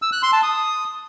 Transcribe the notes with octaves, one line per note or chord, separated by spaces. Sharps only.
E6
F#6
C6
A5
D#6